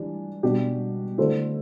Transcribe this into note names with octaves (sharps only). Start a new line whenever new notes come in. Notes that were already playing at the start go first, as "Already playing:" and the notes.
Already playing: E3 G3 D4
B2 G3 D4 G4
D3 A3 E4 A4 C5